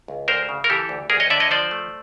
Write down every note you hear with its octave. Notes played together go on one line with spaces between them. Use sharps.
C#2
D2 A#4 C5
C#3
A#4
E3 G4 A4
D2
D2 G#4 A#4
C#5 D#5
D3 D5 E5
C#5 D#5
F3 C5 D5
A3